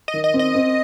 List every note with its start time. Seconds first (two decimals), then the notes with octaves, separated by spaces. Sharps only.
0.08 D#5
0.14 D#3
0.24 D#5
0.34 C4
0.39 D#5
0.55 C4